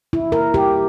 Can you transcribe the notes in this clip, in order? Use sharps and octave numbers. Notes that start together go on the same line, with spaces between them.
E4
A#4
G4